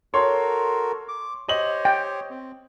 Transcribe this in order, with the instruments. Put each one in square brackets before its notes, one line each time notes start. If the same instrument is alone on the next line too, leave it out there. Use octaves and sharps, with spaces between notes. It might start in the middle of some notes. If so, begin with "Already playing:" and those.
[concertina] F#4 A4 A#4 [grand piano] C#5 C6
[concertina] D6
[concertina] G4 C5 C#5 [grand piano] D#5 F#7
[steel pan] G5
[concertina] C4